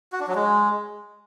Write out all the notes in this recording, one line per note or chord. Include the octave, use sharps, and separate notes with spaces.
F#4
D4
F#3
G#3